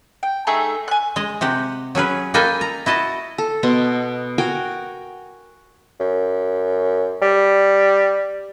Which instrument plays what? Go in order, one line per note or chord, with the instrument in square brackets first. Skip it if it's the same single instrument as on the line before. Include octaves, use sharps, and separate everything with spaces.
[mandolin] G5
A3 D#4 G#4 E5
G#5 F#6
[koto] G#3 D#5
C3 G4 F#5
F#3 C#4 G#4 B4
A#3 A4 B4 D#5 G5 G#5
A#5
E4 F#4 D#5 A5
[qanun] A4
B2 B3 D#5 C6
F#4 A#4 G5 G#5
[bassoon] F#2
G3